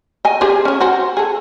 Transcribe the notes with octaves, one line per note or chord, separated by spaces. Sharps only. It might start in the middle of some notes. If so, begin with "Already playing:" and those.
D#5 G#5
G4 G#4 C5
C#4 C#5
F#4 C5
G#4 A4